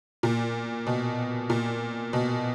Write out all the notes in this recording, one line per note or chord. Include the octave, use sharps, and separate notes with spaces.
A#2
B2
A#2
B2